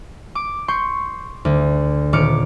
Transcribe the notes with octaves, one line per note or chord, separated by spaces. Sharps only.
D6
C6 C#6 G6
D2
D#1 D6 F6 C#7